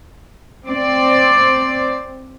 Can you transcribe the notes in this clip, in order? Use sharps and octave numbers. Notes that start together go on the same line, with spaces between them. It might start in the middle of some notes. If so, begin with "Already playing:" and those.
C4 D5